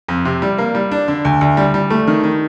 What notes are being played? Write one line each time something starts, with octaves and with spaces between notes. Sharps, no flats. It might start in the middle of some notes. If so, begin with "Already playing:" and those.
F2
C3
G3
A#3
G3
D4
D3
D2
D2
G3
G3
A3
D#3
D#3